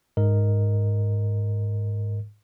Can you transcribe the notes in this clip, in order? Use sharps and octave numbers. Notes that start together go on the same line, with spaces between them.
G#2 A#4 D#5